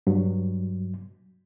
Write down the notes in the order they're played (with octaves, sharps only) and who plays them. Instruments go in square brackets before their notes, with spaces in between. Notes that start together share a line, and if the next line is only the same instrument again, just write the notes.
[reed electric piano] G2 F#3